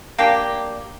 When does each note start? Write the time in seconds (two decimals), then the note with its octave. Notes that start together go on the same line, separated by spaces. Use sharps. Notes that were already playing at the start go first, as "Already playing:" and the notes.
0.18 A#3 D4 G4